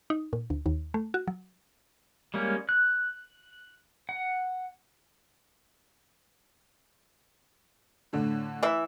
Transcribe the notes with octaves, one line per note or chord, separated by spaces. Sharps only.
D#4
A#2
D2
D#2
A3
F#4
F#3
G3 G#3 A#3 C#4
F#6
F#5
A2 D3
E3 E5